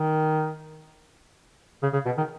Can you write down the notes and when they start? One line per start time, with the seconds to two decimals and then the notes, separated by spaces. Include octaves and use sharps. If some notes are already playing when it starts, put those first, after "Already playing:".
Already playing: D#3
1.82 C#3
1.93 C#3
2.06 B2
2.17 D#3